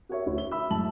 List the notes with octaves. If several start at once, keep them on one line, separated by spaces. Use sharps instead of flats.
F#4 A#4 C#5 E5
D2 E4
G7
E5 B5 E6
F#2 A2 G#3 A5 F#7